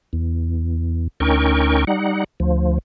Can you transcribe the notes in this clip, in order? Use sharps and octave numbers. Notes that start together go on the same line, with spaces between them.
E2
D2 C#4 D#4 A#4 G5 C#6
G3 D#4 F#5
D2 F3